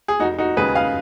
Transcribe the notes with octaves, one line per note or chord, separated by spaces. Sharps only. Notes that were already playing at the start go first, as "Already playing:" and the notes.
G#4
F1 D#4 F#4
D#4 F#4
D#2 C#3 G#3 G#4 B4
F5 G#5